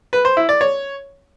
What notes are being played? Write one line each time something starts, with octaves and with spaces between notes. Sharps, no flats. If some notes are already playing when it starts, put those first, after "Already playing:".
B4
C5
E4
D5
C#5